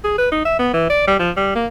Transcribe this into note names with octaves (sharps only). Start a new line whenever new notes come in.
G#4
B4
D#4
E5
B3
E3
D5
G3
F3
G3
A#3